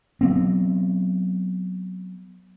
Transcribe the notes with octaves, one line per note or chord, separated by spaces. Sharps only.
F#3 B3 C4